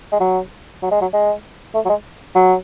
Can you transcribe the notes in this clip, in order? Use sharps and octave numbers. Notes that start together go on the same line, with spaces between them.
G#3
F#3
F#3
G#3
F#3
G#3
A3
F#3
G#3
F#3